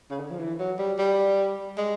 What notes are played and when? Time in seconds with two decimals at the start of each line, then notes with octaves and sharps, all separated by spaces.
0.11 C#3
0.20 D3
0.31 F3
0.39 E3
0.59 F#3
0.79 G3
0.99 G3
1.78 G#3